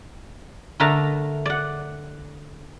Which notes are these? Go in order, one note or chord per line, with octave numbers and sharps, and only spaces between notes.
D3 A3 A#4 A5 A#5
D5 F#5